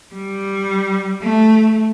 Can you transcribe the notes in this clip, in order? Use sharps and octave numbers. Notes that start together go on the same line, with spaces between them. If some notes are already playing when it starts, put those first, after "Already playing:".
G3
A3